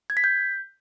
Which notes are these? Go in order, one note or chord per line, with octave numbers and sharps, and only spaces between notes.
G#6
B6
G6